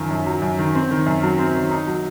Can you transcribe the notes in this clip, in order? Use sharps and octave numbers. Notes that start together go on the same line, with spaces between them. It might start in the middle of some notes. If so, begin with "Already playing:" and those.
Already playing: F#2 D#3 F3
F#2
F#3
F#2
D#3
C4
D#3
F#2
F#3
C4
D#3
D#4
F#3